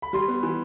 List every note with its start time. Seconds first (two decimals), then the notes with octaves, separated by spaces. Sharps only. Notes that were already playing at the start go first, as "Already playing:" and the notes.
0.02 B5
0.13 G3 C6
0.28 B3
0.43 E3